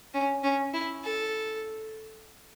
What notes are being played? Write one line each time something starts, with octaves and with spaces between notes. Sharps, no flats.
C#4
C#4
E4
A4